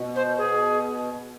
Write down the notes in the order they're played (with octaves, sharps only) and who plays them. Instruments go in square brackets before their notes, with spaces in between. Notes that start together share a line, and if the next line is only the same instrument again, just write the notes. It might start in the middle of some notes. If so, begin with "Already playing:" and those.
Already playing: [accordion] B2
[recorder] C5
G#4